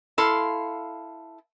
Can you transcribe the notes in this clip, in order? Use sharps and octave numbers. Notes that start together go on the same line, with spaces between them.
E4 A4 F5 C6